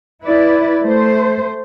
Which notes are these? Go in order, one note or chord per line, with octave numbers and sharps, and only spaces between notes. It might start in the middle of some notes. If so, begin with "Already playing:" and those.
E4 B4 D5
A3 C5